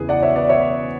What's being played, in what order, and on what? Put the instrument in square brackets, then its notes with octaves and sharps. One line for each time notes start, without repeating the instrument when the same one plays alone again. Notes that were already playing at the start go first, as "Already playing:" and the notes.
Already playing: [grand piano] E2 C#3 E3 G#4 B4
D5 F#5
C#5 E5
B4 D5
C#5 E5